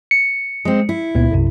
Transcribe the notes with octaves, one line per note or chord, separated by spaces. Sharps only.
C#7
G#3 C4
E4
C#2 A#2 B3
B1 F#2 C3